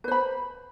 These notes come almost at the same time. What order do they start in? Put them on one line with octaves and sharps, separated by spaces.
B4 C5 B5